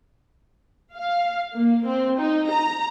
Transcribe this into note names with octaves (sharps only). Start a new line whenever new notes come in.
F5
A#3
C4
D#4
A#5